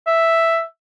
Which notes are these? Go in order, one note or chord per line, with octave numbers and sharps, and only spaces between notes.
E5